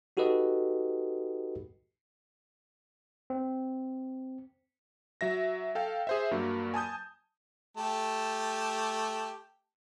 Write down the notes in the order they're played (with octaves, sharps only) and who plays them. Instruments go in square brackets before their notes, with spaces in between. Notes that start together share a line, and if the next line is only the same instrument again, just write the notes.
[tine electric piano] D#4 F#4 G4 A4 B4 D#5
C4
[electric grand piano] F#3 E5 A#6
A4 F5 G5
G#4 C5 E5
G2 F#3 A#3
G#5 A5 D#6 G6
[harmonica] A3 G4 A5